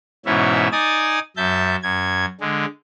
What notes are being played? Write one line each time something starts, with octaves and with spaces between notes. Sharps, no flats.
G#2 B2 E3 C#4 E5
D#4 D5 G#5 D#6 A6
F#2 E5 A5 G6
F#2 G#6
D3 G#3